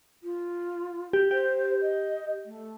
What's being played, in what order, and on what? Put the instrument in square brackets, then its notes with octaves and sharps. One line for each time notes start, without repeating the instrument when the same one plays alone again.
[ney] F4
[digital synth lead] G4
[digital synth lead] G4 [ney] C5
[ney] D#5
A3